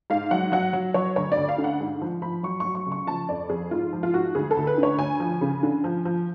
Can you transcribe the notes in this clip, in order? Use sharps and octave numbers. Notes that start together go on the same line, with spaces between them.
G#2 F5
F#3 F#5
F#3 F#5
F#3
F#3 C#5
D2 C#5
D5
D2
F5
D3
F#5
G#2
F3
F3 B5
F#3 C#6
F#3 C#6
C#6
C#2
C#6
F3 A5
F2 D5
F2 G#4
G#2 F4
F3
F4
G#2 F#4
D2 G#4
A4
D2
B4
D3
C#5
D2 G#5
F3
C#3
D3
F3
F3